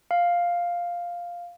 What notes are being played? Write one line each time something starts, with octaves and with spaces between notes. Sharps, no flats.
F5